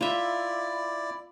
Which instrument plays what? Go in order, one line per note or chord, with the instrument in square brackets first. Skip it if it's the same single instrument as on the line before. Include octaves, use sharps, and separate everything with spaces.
[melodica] E4 D5 [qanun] F4 E5